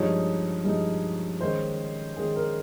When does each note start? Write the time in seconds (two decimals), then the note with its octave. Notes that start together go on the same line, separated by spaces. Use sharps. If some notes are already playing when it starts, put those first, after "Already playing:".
Already playing: G2 F3 G#3 D#4 C#5
0.64 G2 F3 G#3 D#4
1.41 D#3 G#3 C#4 C5
2.16 D#3 G#3 C#4 G#4
2.36 A#4